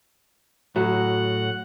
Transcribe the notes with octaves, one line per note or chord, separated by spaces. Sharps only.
A2 F#3 F#4 F#5